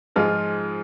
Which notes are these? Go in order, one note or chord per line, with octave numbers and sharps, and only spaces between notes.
G#2 F3 G#3 F4